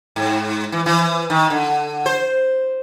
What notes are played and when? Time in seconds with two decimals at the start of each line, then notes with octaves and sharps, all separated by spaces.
0.16 G#2
0.72 E3
0.86 E3
1.30 D#3
1.50 D3
2.06 C5